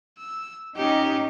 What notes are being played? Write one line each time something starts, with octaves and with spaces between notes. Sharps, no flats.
E6
C#4 D#4 G4